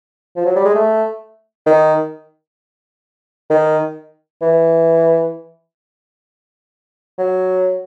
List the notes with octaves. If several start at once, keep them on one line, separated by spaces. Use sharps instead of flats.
F3
F#3
G3
G#3
A3
D#3
D#3
E3
F#3